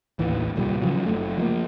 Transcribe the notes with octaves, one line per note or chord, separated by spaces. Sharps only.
A1 D#2 E3
D1 C2 A#2 G3
C#3 F3 F#3
F#1 A3
F3 G3 A#3